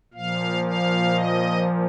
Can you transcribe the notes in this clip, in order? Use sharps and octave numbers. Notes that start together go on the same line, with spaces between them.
A#2 F3 F5
F5
D#5